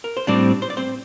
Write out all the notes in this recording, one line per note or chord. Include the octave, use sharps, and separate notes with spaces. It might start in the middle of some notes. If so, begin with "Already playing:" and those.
A#4
C5
A2 G3 C4 D4 D5
C5
D5
C4 C5